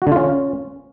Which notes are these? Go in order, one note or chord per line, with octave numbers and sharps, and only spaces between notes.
F#4
D3
F4
C#4